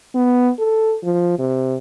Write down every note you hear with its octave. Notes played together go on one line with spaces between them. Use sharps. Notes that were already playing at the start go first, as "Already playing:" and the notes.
B3
A4
F3
C3